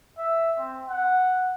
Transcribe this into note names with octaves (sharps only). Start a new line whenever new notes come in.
E5
C4
F#5